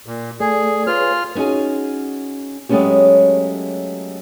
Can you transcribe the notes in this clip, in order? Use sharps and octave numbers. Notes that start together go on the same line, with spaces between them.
A#2
A3 G#4 A4 D5
F4 G#4 B4 C#5 F6
B3 C#4 D#4 F#4 G#4
F#3 G#3 A3 B3 C#4 G4